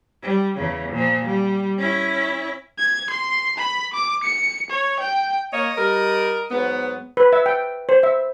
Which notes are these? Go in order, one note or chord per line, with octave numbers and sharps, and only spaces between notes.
G3
E2 C#3
A#2 F3
G3
C#4 E4
G#6
C6
B5
D6
C#7
C#5
G5
A#3 C#5 D#5
G3 A#4
G#2 F#3 B3
B4
E5
G5
C5
E5